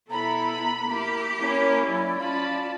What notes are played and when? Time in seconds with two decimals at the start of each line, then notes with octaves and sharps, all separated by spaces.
0.10 B2 B3 E4 A4 A#5 B5
0.88 A#3 E4 G4
1.39 A#3 C#4 E4
1.86 F#3 D5
2.19 C#4 F4 D5 A5 B5